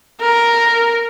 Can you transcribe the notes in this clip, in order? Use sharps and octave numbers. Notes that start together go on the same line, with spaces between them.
A#4